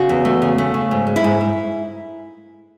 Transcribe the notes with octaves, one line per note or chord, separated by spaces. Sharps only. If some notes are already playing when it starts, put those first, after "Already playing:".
Already playing: C#3 F#4
E2
A3
C#3
A3
C#3
G#2
G#3
E4
G#2
G#2